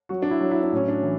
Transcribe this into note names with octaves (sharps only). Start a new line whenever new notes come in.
F#3 F#4
D4
E4
F#3
E4
D4
A2 C#4
D4
E3